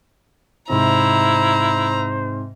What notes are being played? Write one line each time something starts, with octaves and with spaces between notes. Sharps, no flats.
G#2 C3 E4 C5 A#5